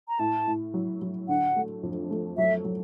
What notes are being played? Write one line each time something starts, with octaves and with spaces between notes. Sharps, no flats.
A#5
A2 A5
A2
F#3
F#3
D3 F#5
A3
F2
A3
F#3 E5
F#3